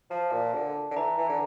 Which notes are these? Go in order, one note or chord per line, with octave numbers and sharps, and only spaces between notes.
F3 A5
A#2
D3
D3
E3 A#5
E3
D3